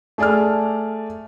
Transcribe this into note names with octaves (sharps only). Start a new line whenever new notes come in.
A3 G#4 D5 A5 F6